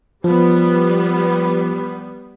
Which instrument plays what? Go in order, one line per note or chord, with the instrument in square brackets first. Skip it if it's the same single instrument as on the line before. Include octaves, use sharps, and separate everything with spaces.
[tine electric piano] F3 [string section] G3 B3